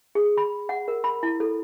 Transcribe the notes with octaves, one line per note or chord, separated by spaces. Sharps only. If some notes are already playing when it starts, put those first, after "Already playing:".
G#4
B5
F#5
A#4
B5
E4
A4